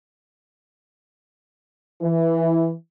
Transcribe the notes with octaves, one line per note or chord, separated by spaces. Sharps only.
E3